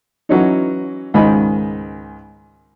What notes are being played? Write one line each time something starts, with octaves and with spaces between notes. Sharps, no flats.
E3 F#3 C#4 D#4
C#2 G#2 D#3 D#5 B5